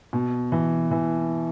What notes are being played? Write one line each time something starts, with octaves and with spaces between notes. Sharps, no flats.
B2
E3
E3